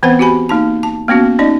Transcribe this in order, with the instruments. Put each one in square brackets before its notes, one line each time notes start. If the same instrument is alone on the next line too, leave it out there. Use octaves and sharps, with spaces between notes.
[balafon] E3 B3 C4 B4 C5 F#5
F#4 G4 G#5 B5
A#3 D#4 A5
A5
A#3 B3 C#4 F#4
C#4 D#4 D5 D#5